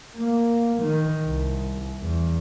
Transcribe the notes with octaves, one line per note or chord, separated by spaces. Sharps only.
A#3
D#3
C2
E2